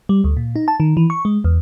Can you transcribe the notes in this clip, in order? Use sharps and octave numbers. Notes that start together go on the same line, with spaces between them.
G3
D2
A#2
D#4
A5
D#3
E3
C#6
G#3
E2